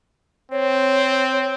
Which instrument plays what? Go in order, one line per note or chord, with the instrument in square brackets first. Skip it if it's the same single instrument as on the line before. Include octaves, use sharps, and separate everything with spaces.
[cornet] C4 [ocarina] C#5